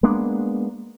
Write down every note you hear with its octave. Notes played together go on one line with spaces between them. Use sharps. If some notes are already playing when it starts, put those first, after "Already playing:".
G#3 A#3 B3 D4